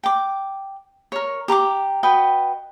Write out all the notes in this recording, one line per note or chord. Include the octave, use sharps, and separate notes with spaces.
G5 D6
A#4 C#5
G4 A#5 C#6 D6
F#4 B4 D#5 G5